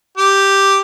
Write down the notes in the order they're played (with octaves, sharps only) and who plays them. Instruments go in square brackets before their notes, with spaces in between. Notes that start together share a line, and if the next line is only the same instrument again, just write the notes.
[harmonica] G4